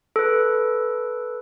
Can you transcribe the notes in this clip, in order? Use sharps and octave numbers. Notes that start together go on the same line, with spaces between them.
A4 B4